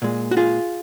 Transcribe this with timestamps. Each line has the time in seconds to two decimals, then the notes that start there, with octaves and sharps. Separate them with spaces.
0.02 A#2 G#3
0.31 F#4
0.37 F4 G#4